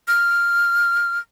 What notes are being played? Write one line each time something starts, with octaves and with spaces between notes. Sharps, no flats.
F6